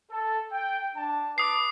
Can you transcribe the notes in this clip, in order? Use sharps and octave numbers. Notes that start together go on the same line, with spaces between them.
A4
G5
D4 A5
B4 A5 D6 D#6 C7